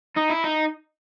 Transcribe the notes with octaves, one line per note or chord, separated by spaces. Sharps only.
D#4
E4
D#4